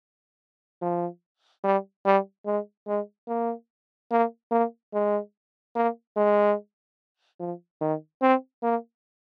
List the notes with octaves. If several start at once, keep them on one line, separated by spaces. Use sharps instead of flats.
F3
G3
G3
G#3
G#3
A#3
A#3
A#3
G#3
A#3
G#3
F3
D#3
C4
A#3